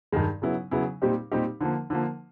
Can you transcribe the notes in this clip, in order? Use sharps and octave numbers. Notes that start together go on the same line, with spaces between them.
G2 D#3 G#3
C#3 F#3 B3 E4
C#3 F#3 B3 E4
A#2 G3 C4 D#4 G4
A#2 G3 C4 D#4 G4
D3 F3 A#3
D3 F3 A#3